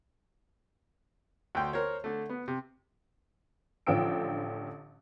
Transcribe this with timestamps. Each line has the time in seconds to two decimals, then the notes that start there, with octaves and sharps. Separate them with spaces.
1.55 D2 G5 C6
1.73 A#4 C5 C#5
2.04 D3 A3
2.30 B3
2.48 C3
3.87 A1 D3 F3 G5 E6 D7